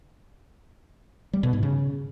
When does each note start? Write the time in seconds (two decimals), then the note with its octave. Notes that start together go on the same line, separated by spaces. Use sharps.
1.33 G3
1.43 B2
1.53 G#2
1.63 C#3